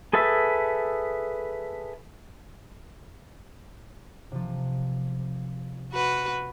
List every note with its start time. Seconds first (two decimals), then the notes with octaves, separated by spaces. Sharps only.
0.13 G#4 A4 B4 E5 E6
4.32 C3 F3
5.93 F#4 B4